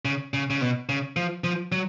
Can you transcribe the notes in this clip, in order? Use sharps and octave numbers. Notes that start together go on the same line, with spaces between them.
C#3
C#3
C#3
B2
C#3
F3
F3
F#3